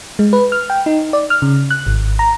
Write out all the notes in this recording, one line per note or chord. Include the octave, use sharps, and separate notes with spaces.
G#3
B4
F6
G5
D#4
D5
F6
C#3
F#6
G#1
A#5